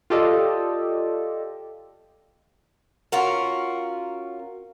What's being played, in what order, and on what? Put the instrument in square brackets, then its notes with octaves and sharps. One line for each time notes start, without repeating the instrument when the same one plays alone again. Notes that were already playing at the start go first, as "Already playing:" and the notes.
[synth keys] F4 G4 A4 D5 D#5
[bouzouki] C#4 F4 F#4 A#4